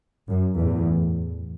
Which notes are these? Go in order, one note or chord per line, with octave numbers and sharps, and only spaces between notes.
F#2
E2 A2